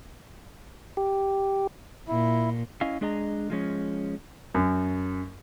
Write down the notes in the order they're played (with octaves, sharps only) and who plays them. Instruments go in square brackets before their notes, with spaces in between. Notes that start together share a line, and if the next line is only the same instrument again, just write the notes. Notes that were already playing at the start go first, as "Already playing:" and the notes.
[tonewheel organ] G4
[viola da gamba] A#2 [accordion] E4
[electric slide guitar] C#4 E4 D#5 F5 G#5
G#3 D4 G#4 D#5 A5 A#5
F3 G#3 C#4
[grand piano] F#2